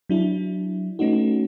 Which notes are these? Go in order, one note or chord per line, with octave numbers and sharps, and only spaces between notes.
F#3 D4 E4
A3 B3 C#4 D#4 F#4